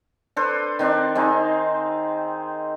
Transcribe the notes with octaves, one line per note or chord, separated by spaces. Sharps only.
D4 A4 B4 C5
D#3 C4 D4
C4 D#4 G#4